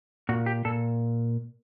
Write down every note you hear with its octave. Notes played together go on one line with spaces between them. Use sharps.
A#2 F#4
G4
A#2 A4